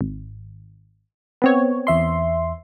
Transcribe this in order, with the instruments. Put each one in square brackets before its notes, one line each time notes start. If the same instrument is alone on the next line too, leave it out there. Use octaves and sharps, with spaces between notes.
[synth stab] G#1
B3 C4 C#5
[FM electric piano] E2 E5 C6